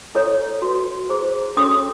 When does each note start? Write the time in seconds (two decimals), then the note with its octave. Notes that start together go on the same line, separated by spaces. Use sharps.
0.15 E4 A4 C#5
0.62 F#4 B4
1.09 E4 G#4 C5
1.57 C#4 F#4 A4 C#5 D#6